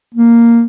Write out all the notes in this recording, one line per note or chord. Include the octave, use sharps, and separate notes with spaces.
A#3